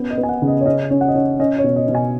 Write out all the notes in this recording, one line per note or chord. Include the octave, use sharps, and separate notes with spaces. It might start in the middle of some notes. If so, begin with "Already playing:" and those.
Already playing: B3 C#4
D#5
B3
G#5
F#5
C#3
D#5
C#5
C#4 D#5
C#4 C#5
F#5
D#5
C#4 C#5
C#4 D#5
C#5
B2
D#5
B2
G#5